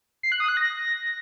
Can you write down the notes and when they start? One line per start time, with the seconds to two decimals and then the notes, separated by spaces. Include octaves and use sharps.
0.23 C7
0.32 F#6
0.40 D#6
0.49 F#6
0.57 A#6